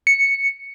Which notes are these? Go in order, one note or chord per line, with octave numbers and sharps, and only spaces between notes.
C#7